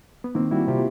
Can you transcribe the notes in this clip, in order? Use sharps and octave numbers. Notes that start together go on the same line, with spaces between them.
B3
D#3 A#3 C4
G3 E4 F#4
C3 F4 G4